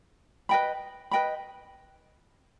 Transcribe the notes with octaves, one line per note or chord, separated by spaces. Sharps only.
B4 D#5 G5 B5
B4 D#5 G5 B5